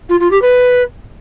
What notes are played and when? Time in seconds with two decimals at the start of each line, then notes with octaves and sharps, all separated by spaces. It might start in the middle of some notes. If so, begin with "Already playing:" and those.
0.09 F4
0.20 F4
0.31 G4
0.41 B4